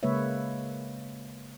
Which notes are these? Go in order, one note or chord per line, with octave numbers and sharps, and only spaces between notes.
C#3 G#3 A#3 B4 C#5 E5